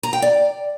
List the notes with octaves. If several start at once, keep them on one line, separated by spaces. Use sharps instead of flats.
A#5
G5
D5